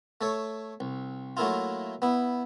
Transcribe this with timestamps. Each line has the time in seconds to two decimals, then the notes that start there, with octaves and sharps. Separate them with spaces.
0.21 A3 A4 C#5
0.80 C2
1.37 F#3 A3 A#3 E4 F4
2.02 B3 E4